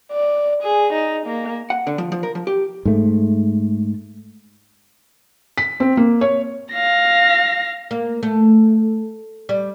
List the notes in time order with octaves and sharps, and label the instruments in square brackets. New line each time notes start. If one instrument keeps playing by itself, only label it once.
[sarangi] D5
G#4
D#4
A#3
[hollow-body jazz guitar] F#5
D3
F3
F3
A#4
F3
G4
[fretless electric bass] G#2 A3
[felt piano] B6
C4
A#3
C#5
[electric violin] F5 A#6
[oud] A#3
A3
G3